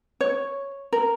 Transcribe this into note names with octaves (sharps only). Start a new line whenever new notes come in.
C#5
A#4